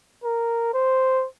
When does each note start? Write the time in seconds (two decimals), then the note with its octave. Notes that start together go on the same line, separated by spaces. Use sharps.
0.24 A#4
0.74 C5